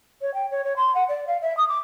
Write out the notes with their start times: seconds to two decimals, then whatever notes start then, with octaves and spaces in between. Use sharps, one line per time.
0.22 C#5
0.34 G5
0.51 C#5
0.64 C#5
0.76 C6
0.94 F#5
1.09 D5
1.27 F5
1.41 E5
1.57 D#6
1.69 D6